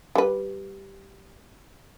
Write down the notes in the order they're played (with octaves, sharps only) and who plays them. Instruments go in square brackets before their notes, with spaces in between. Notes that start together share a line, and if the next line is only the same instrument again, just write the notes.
[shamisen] G3 B4